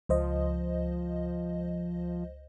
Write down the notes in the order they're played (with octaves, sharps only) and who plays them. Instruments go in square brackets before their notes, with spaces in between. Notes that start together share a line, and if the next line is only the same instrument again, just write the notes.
[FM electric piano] C#2 C5 D#5 [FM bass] F3